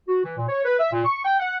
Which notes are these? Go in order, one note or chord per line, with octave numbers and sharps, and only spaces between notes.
F#4
E3
A#2
C#5
B4
E5
A#2
C#6
G5
F#5